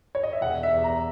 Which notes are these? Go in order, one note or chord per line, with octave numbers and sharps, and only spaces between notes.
C#5
D#5
E5
E1 F#5
E5
E2
A#5